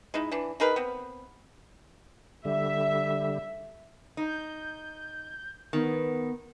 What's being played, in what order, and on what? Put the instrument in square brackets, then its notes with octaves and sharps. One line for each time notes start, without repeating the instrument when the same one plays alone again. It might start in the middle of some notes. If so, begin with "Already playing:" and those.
[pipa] G#3 D#4 E4
E3 D4
D#4 G#4 A#4 B4
B3 C4
[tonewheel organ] D3 G3 [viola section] E5
[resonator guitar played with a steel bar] D#4 [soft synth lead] G6
[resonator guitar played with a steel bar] D#3 [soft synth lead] B3